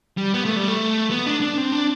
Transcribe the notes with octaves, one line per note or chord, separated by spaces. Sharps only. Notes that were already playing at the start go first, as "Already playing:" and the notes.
G3
B3
A3
G3
A3
B3
D4
D4
C4
D4